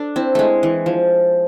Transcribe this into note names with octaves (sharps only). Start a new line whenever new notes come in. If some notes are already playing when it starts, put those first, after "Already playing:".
Already playing: D4 A4
C4 E4
G#3 A3
E3
F3